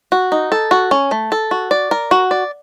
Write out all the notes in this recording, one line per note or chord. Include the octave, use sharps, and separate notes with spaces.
F#4
D#4
A4
F#4
C#4
A3
A4
F#4
D5
A#4
F#4
D5